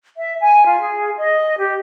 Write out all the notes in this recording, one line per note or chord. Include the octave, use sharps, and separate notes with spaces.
E5
G#5
F4
G#4
D#5
G4